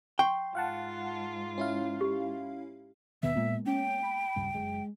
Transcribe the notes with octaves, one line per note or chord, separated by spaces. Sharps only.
G5 C6 C#6
G#2 F4 F5 F#5 A5
C#4 E4 F5
G4
D#2 B2 D#3 B3 E5
A#2 G#3 A#3 B3
C#4 G5
B5
D#1 C#2 G2
F#1 G#3